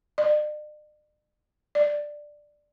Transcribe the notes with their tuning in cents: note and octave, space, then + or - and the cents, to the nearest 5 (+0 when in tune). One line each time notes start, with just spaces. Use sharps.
D5 +45
D5 +10